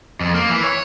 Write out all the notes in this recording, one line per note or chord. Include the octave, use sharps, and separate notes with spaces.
F2
A#3
E3
C#5